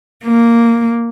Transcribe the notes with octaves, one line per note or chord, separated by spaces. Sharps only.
A#3